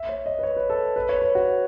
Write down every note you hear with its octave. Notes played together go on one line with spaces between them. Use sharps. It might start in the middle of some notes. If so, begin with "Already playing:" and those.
Already playing: E5
C#5
D#5
B4
C#5
B4
A4
B4
C#5
B4
F#4